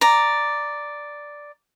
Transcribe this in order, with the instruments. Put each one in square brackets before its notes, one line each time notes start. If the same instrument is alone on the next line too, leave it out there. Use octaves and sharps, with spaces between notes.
[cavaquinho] D5 A#5